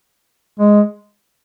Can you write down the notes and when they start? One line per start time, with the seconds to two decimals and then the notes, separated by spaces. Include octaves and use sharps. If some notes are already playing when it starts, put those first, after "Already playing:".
0.59 G#3